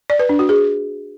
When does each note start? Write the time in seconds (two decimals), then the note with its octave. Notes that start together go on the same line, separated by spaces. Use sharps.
0.10 D5
0.19 B4
0.29 D4
0.39 F#4
0.49 G#4